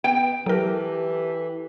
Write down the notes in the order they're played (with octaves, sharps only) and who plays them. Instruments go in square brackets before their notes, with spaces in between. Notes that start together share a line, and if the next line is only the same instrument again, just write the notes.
[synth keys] B3 [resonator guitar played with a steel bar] G5
[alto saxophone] E3 [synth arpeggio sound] F#3 A#4 [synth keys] G4 A4